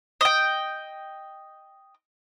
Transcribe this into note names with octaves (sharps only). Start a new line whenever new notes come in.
D#5 G5